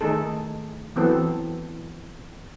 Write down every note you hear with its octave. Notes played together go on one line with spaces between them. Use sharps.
D#3 A3 D#4 G#4 A4
E3 F#3 B3 C4 A4